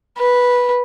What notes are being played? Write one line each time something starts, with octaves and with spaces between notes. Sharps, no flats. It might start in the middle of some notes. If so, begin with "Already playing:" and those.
B4